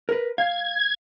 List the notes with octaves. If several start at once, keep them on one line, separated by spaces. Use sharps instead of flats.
A#4 B4
F5 G#6